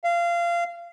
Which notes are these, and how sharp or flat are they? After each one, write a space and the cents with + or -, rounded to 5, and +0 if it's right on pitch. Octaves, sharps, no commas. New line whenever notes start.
F5 -20